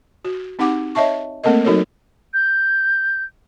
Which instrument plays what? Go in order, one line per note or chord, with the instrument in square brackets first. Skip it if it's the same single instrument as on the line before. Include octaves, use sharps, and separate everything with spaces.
[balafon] F#4
C4 D#4 G4 F#5 D6
C#5 D#5 E5 A5 C#6
A3 A#3 C4 A4 A#4 D#5
F#3 D#4 F#4 A4 A#4 C#5
[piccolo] G6